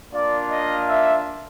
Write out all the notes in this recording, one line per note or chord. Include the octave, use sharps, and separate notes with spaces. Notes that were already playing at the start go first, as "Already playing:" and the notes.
A#3 D4 F4 D5
D#5
E5